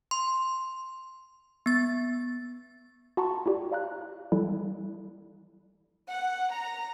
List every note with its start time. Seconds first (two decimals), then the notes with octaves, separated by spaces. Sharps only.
0.11 C6
1.66 B3 A6
3.17 F#4 F#5 A5 A#5 C6 C#6
3.46 E4 F4 G4 D5
3.72 D5 F5 A#5 F#6
4.32 E3 G3 E4 A4
6.08 F#5
6.51 A#5